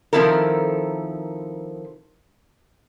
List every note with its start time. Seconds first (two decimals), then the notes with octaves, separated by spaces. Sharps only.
0.13 D#3 F3 C4 E4 A4 A#4